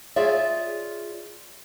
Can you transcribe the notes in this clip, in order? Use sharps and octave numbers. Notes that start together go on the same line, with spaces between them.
F4 G#4 C#5 D5 E5